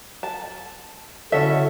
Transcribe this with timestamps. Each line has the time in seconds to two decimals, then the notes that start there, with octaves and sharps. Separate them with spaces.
0.23 A5
1.32 D3 C#4 E4 F#4 A4 E5